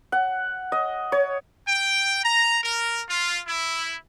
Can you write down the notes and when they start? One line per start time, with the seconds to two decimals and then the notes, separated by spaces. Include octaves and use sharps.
0.12 F#5
0.72 D#5
1.12 C#5
1.67 G5
2.24 A#5
2.62 A#4
3.08 F4
3.46 E4